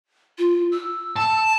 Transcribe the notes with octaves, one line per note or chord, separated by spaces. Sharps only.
F4
E6
A5